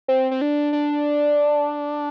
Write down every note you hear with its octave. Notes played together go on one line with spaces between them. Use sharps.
C4
C4
D4
D4